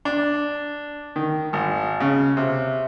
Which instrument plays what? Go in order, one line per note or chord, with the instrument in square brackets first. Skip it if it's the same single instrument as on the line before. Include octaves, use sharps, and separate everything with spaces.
[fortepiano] D4
D#3
G#1
C#3
C3